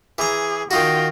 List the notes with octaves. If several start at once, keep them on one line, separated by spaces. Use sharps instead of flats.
E3 G#4 A#5
D#3 D#4 F4 F#4 G5 A#6